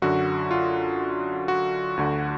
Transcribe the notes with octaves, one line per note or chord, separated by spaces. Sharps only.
F#2 D3 F#4
F4
F#4
D2 D3